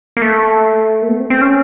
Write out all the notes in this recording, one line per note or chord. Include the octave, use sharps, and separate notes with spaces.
A#3
A3
A#3
B3
C4
C4
C#4